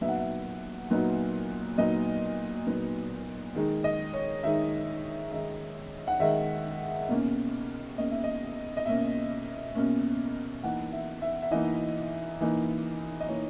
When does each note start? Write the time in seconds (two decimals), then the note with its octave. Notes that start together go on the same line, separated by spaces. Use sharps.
0.01 A#2 F#3 B3 D#4 E5
0.09 F#5
0.16 E5
0.90 A#2 F#3 B3 D#4
1.78 A#2 F#3 B3 D#4 D#5
2.67 A#2 F#3 B3 D#4
3.55 D#3 G#3 D#4
3.84 D#5
4.14 C#5
4.43 D#3 G#3 D#4 E5
5.32 D#3 G#3 D#4 E5
6.08 F#5
6.20 D#3 G#3 D#4 E5
7.09 B2 A#3 C#4
7.98 B2 A#3 C#4 D#5
8.11 E5
8.24 D#5
8.77 D#5
8.86 B2 A#3 C#4 E5
9.75 B2 A#3 C#4
10.63 E3 A#3 D#4 F#5
10.92 E5
11.22 E5
11.42 E5
11.51 E3 A#3 D#4 D#5
12.41 E3 A#3 D#4
13.20 D#5
13.29 E3 A#3 D#4 C#5